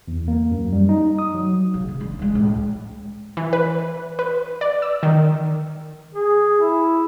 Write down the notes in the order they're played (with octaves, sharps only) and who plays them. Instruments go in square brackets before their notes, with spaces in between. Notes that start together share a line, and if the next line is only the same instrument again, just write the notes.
[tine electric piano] E2
A#3
F#2
G3
D#4
D#6
F#3
[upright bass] C#3
C#3
D3
F3 G#3
C#2 A2
[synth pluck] E3
B4
B4
D5
E6
D#3
[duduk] G#4
E4